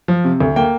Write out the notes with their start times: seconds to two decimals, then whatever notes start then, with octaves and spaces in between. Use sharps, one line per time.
0.08 F3
0.24 C3
0.41 D2
0.56 A#3 G5